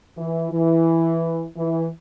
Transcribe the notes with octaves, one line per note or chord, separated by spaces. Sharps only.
E3
E3
E3